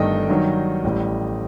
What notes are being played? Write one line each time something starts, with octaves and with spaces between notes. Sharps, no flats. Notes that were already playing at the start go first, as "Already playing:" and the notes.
Already playing: G1 G2 D#3 A3 D#5 G5
G2 D#3 F#3
A1 A2 G3